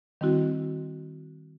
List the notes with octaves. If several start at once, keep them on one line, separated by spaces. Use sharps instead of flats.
D#3 G3 C4 E4 F#4